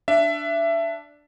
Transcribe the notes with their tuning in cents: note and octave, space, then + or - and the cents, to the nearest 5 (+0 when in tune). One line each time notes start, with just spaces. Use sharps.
D4 +0 E5 +20